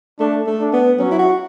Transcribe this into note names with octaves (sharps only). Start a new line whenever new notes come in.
A3 D4
A3
D4
B3
F#3 C#4
E4
F#4